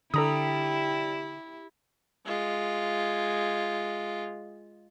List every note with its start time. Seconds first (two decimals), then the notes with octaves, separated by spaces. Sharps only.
0.14 D3 G3 E4 A4 A#5 D#6
2.26 G#3 F4